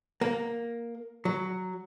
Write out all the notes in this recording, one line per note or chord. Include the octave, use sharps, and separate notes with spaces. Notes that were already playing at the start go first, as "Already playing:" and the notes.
A#3
F#3